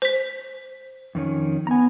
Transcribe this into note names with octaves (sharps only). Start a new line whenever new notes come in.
C5 B6
F2 D#3 C#4
B3 G#5 A#5